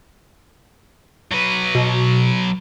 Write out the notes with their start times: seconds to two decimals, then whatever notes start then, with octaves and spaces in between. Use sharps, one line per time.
1.31 F#3 B4
1.75 B2